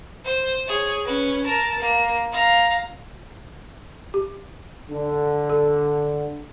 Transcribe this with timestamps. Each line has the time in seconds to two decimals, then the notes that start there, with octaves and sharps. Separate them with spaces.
0.25 C5
0.68 G#4 C#5
1.05 C#4 B4
1.46 A#4 A5
1.79 A#3
2.32 F5 A#5
4.14 G4
4.90 D3
5.50 A4